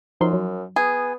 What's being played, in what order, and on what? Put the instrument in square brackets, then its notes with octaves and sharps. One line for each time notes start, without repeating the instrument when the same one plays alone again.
[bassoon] F#2 [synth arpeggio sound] F3 D#4 C6
[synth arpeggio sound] F#3
[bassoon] B3 [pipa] G#4